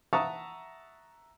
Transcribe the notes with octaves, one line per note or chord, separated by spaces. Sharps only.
E5 F#5 A5 A#5 C#6 D#6